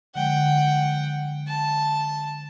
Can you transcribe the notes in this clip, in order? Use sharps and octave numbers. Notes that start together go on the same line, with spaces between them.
D3 F3 G#3 F#5 G5
A5